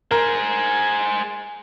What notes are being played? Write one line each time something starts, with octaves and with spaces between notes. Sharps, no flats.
G#4 A#4 C5